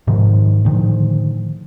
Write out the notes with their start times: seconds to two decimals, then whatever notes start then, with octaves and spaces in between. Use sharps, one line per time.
0.07 G#2 C3 D#3 F3
0.65 A2 D3 D#3 F3